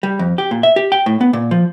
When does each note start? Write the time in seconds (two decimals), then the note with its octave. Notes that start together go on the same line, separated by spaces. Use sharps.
0.03 G3
0.19 F2
0.38 G4
0.51 A#2
0.63 E5
0.76 G4
0.92 G5
1.06 A2
1.21 B3
1.33 A#2
1.51 F3